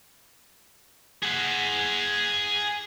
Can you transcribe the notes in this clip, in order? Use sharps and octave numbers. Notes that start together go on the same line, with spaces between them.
G#4 F#5